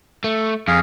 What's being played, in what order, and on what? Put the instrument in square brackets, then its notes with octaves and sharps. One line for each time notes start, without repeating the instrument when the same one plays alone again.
[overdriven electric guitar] A3
[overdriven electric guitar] F2 [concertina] G#4 F5